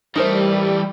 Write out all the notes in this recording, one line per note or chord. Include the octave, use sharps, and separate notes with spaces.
E3 G3 A3 D#4 A#4 C5